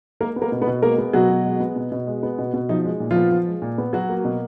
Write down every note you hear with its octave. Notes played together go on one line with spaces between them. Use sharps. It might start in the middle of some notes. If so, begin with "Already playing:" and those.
G#3 A#3 A#4
B3
A#3 A#4
B2
B3 B4
B2
G#3 A#3 A#4
B3
B2 F#3 F#4
B2
G#3
B3
B2
B2
G#3
B3
B2
B2
F3 D#4
G#3
A#2
F3 F4
B3
F3
G#3
A#2
B3
F#3 F#4
A#3
B2